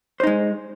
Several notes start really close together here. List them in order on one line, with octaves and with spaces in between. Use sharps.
C5 D#4 G#3